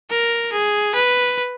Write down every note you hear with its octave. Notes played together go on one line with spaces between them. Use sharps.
A#4
G#4
B4